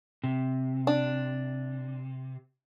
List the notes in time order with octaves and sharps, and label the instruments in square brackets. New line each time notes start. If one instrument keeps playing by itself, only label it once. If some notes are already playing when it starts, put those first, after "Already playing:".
[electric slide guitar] C3
[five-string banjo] D4